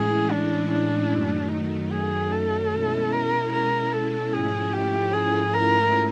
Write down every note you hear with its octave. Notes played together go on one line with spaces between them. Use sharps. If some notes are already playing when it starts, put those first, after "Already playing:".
Already playing: A2 E3 G#3 C#4 E4 G#4
D4
D4
F#2 D#3 F#3 A3
D#4
G#4
A4
B2 G#3 C#4 E4
A#4
A#4
A4
G#2 F3 A3 C#4 E4 G#4
G4
G#4
A#4